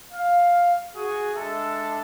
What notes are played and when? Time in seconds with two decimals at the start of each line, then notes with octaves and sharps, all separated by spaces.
0.13 F5
0.96 F#4 G#4
1.35 G#3 D4 A4 E5 A5